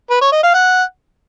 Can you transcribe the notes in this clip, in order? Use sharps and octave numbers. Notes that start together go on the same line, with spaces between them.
B4
C#5
D#5
F5
F#5